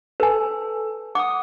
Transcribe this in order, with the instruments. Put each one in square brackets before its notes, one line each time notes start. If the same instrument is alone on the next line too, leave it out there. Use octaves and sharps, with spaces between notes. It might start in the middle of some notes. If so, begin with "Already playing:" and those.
[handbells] A4 [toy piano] B4 G#5
[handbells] F#5 D#6 [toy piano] D6